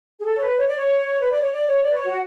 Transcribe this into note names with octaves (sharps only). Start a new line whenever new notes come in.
G#4
A4
C#5
B4
C#5
D5
C#5
B4
D5
C#5
D5
C#5
D5
B4
C#5
F#4